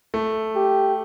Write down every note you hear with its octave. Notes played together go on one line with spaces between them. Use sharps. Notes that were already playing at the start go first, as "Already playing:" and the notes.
A3
G4